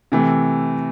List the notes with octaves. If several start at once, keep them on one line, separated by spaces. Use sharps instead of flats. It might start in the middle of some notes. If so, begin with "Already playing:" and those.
C3 E3 A3